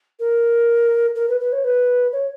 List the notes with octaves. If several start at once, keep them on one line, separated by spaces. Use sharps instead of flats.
A#4
A#4
B4
B4
C#5
B4
C#5